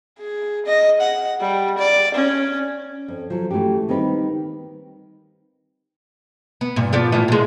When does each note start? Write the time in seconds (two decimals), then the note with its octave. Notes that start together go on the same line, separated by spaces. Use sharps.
0.19 G#4
0.66 D#5
1.01 F#5
1.40 G3
1.78 D5
2.14 C#4
3.08 F2
3.30 F3 F#3 A4
3.51 E3 A3 C#4 F#4 G4
3.89 D#3 G3 A#3 C4 D#4 B4
6.61 B3
6.76 G2 A#2
6.93 F3 B3 D5
7.12 A2 E3 F4
7.28 A#2 G#3